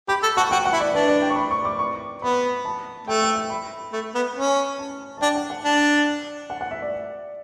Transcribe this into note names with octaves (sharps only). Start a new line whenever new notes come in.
G4 B5
A4
F#4 A5
F#4 G5
F#5
E4
D5
D4 B4
D5
G5
C#6
B5
C#6
D6
C#6
B3 B5
A5
A3 G5
G5
G5
B5
A3
B3
C#4
A5
A5
D4 G5
F#5
F#5
D4
F#5
F#5
E5
D5